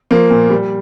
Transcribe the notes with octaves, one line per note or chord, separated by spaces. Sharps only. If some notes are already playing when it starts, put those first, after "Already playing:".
F3 A#3
A#2
G3